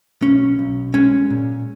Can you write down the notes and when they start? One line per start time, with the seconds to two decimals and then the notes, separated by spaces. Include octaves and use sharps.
0.22 B1 C#4
0.59 B1
0.94 G#3 C#4
1.30 A#2